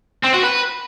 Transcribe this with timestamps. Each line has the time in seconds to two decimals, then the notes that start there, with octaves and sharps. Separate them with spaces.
0.24 C4
0.34 F#4
0.44 B4